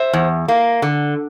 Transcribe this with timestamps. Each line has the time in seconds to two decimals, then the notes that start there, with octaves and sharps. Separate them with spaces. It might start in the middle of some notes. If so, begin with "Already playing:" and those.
Already playing: C5 E5
0.13 E2
0.48 A#3
0.82 D3